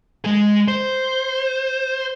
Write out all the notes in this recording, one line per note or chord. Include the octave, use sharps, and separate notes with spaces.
G#3 G#4
C5